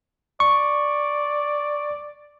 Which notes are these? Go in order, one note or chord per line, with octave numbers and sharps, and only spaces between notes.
D5 C#6